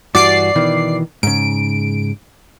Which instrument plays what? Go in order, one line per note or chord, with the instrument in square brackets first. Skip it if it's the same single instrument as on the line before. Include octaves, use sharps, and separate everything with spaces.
[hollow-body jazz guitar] G2 E3 F#4 [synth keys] D5 C7
[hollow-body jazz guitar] B2 D#3 E3
[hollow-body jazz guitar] G#2 C#3 [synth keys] D7